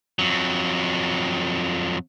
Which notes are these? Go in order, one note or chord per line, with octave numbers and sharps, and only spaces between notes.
F2 F#3